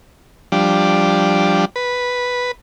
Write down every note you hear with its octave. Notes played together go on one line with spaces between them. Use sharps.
F3 G3 D4
B4